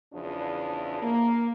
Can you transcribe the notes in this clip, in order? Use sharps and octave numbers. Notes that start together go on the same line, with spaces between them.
E2 C#3 F3 D4
A#3